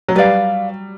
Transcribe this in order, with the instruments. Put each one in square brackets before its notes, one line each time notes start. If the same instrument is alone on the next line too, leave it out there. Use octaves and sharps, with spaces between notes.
[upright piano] F#3
[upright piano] G3 [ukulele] B4 D5 F5